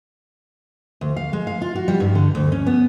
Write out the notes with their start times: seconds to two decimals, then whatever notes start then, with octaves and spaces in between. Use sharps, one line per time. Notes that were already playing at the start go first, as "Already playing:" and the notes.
1.01 D2
1.16 F5
1.33 G#3
1.47 F5
1.62 F4
1.76 F#4
1.88 G3
2.00 G2
2.15 D3
2.35 D2
2.52 C#4
2.67 B3